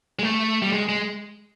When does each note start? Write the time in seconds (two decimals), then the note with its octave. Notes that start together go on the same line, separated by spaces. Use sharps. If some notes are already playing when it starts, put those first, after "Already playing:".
0.19 G#3
0.23 A3
0.62 G3
0.72 G#3
0.89 G#3